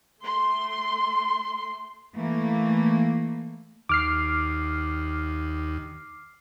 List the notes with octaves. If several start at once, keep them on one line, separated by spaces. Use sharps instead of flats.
A3 C6
E3 A3 A#3
D#2 D6 F6 C7